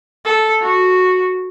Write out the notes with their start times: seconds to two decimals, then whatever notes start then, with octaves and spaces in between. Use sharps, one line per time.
0.25 A4
0.61 F#4